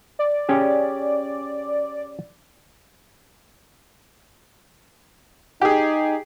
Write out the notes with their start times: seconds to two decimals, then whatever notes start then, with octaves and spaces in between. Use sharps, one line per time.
0.19 D5
0.49 C#4 G4 G#4
5.61 D#4 G4 G#4